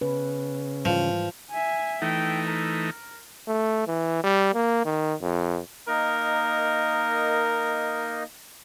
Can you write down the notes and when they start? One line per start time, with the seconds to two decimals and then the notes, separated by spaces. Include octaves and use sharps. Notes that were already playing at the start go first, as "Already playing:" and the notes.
0.01 C#3 B4
0.85 G#2 E3 F3 G3
1.51 E5 G#5
2.02 E3 A3 D#4 G5
2.48 A#4
3.48 A3
3.87 E3
4.24 G3
4.54 A#3
4.85 D#3
5.22 F2
5.88 A#3 D#4 A#4 D#5